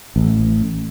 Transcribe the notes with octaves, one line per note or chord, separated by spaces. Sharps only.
A1